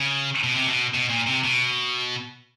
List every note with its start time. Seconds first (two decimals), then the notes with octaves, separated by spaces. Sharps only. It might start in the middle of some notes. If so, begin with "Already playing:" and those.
Already playing: C#3
0.44 B2
0.55 C3
0.68 B2
0.94 B2
1.10 A#2
1.27 C3
1.44 B2